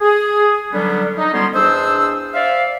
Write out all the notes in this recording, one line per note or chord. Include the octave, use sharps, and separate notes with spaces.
G#4
D3 F#3 G3 B3 C#4 D4
D#4
D2 G3 B3 C#4 C6
E2 D4 C5 D#5 E6
C5 D5 E5 F5